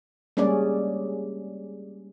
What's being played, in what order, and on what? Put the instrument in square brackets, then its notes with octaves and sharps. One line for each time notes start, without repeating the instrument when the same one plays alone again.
[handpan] G3 G#3 A#3 C#4 G#4 D5